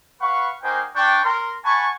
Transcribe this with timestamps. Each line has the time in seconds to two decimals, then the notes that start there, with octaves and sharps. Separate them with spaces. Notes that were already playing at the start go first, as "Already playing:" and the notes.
0.21 B4 F5 F#5 B5 C#6
0.63 A#3 D#4 F#4 C5 G5 G#5
0.94 D4 G5 C#6
1.23 A#4 C6
1.64 F#5 G#5 A5 B5 C#6